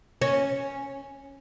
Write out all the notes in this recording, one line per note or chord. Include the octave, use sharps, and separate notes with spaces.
C#4